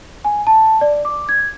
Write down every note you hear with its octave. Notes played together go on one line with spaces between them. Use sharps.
G#5
A5
D5
D6
G#6